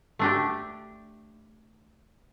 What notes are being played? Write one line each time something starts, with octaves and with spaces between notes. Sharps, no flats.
A3 D4 G4